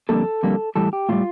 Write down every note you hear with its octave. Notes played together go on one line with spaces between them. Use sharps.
F2 D3 G3 A#3 A4
F2 D3 G3 A#3
A2 E3 G3 A4
G4
A2 E3 G3 F4